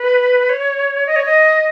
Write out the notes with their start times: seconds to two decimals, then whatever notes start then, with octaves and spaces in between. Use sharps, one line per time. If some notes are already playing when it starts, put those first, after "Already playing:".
Already playing: B4
0.49 C#5
1.07 D#5
1.16 C#5
1.25 D#5